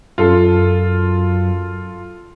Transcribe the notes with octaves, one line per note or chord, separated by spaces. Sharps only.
F#2 F4 A4